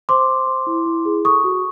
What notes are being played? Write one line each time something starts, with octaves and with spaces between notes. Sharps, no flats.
C5 C6 D6
C5
C5
E4
E4
G#4
A4 C#6 D#6
F#4